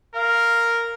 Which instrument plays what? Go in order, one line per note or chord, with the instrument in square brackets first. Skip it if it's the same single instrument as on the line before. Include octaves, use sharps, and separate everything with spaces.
[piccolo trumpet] A#4 [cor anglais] F5